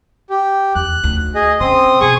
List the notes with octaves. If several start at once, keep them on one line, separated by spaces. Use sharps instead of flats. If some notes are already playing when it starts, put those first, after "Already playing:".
G4
E2 F#6
D2
G#4 D#5
C#3 C4 C6 D#6
B2 G#4 C#6 D#6